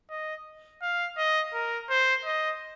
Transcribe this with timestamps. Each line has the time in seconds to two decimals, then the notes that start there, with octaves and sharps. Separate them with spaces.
0.10 D#5
0.82 F5
1.17 D#5
1.54 A#4
1.90 C5
2.25 D#5